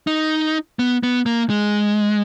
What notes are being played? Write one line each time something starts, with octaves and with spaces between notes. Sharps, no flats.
D#4
B3
B3
A#3
G#3